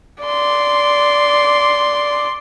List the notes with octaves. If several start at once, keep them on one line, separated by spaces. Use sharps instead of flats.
D5 C6